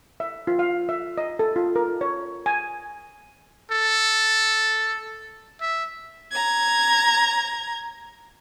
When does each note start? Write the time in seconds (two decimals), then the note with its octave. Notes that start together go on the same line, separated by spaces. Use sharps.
0.20 E5
0.47 F4
0.59 F5
0.89 E5
1.18 D#5
1.39 A4
1.56 F4
1.76 A#4
2.01 C#5
2.46 G#5
3.71 A4
5.61 E5
6.32 A#5 G#6